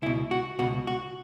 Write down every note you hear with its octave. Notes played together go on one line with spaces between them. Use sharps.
C#2 B2 E4
F#4
C#2 B2 F#4
F#4